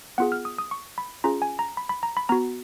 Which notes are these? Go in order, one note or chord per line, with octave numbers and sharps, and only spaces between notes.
B3 F4 G#4 F#5
F6
D#6
D#6
C#6
B5
C#4 F4 G#4 A#5
G#5
A#5
B5
B5
A#5
B5
B3 F#4 A#5